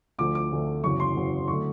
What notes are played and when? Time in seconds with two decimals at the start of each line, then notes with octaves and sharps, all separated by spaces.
0.18 D2 D3 F3 A3 D6
0.35 D6
0.51 D2 D3 F3 A3
0.83 F#1 E2 C#3 F#3 C#6
1.00 C6
1.15 F#1 E2 C#3 F#3
1.48 D3 F#3 A3 C#6